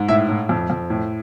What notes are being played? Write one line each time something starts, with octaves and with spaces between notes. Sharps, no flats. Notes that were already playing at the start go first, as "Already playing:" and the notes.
Already playing: G#2
A2 E5
A2
F2
F2
A2